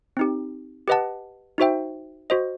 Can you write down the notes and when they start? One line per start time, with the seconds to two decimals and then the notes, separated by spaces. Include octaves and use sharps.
0.17 C4 D#4 G4
0.88 G4 B4 D#5 F#5 A5
1.58 D#4 F#4 C5 E5 G5
2.30 F#4 C5 D#5